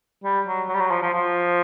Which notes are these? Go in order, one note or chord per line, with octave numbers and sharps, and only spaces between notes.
G3
F#3
F#3
G3
F#3
F3
F3
F3